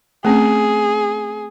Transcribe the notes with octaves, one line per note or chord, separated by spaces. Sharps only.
A3 C4 C#4 G#4